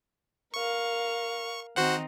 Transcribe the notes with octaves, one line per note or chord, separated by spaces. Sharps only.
A#4 F5 C#6
D#3 C4 D#4 F#4 C5 F#5